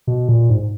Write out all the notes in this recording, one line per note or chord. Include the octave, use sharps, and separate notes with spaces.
B2
A#2
G#2